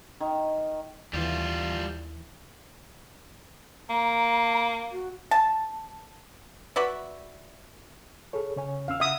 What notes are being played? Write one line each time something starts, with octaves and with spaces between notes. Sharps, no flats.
D#3
D#2 E3 G3 F4
A#3 A#5
F#4
A5
F#4 B4 D5 E5
G#4 A4 C#5
C#3 C#5 G#5
E2 C#4 F5 E6
C#3 E5 F#5 D#6 G#6